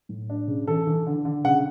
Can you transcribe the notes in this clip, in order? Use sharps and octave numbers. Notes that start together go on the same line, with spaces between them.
A2
D4
C#3
E3 A4
E3
D3
D3
C#3 F#5